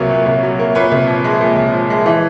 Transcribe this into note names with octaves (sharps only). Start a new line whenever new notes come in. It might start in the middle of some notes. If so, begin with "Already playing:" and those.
Already playing: C2 A#2 F#3 A#3 B4 C#5
A#2
C2
F#3
A#3
A#2 B4 C#5
C2
F3
G#3
A#2
C2
F3
G#3
E3